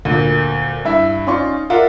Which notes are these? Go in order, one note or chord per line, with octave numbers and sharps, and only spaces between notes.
D2 A#2
G2 E4 E5
C#4 D#4 F4 D5 C6 C#6
F4 A#4 D5 E5 F#5